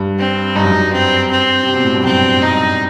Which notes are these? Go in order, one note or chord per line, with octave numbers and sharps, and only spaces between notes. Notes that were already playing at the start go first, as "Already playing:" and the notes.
Already playing: G2
C4
G2 D#4
F#2
G2
C4
C4
C3
B2
A2
G2
F#2 C4
G2 D#4